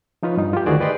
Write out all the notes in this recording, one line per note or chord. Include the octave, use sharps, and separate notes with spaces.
F3 D#4 F4 B4 C#5
G2 D#4
F4 G4
D2 D#3 F#4 G#4 C5 D5
B4 D5 D#5 G5 C6